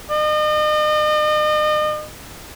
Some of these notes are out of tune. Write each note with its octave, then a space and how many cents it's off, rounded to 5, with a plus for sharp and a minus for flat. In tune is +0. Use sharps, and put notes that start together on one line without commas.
D#5 -40